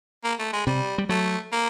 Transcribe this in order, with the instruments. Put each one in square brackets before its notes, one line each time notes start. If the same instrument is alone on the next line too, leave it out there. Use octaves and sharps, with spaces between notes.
[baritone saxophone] A#3
A3
G#3
[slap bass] C3 [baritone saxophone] G3
[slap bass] G3
[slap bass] F#3 [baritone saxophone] A3
[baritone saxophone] A#3